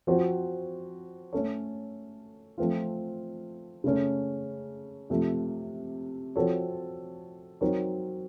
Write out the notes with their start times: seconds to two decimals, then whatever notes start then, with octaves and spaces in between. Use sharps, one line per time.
0.07 F3 C4 F#4 C5
1.33 A3 C#4 A4 C#5
2.58 F3 A3 C4 F4
3.84 C#3 A3 C#4
5.10 C3 F3 A3
6.36 F3 C4 F#4 A4 C#5
7.61 F#3 C4 D#4 A#4 C#5